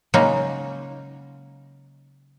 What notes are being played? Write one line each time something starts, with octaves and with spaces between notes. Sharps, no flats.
C#3 F#3 G#3 A#3 C#4 D#4